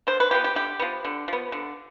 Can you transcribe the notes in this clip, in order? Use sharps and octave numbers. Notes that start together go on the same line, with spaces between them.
D3 C5
B4
F3 B3 G4
G4
D3 G4
F3 B3
D3
F3 B3
D3